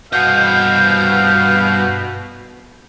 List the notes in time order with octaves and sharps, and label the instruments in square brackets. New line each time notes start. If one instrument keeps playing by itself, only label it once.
[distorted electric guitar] G2 D#5 [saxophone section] B2 [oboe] F5 [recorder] G6